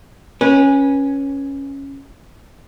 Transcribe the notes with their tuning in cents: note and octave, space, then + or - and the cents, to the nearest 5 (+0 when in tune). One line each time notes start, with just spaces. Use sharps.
C#4 -5 B4 -25